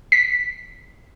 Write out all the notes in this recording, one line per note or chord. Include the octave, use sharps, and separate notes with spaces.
B6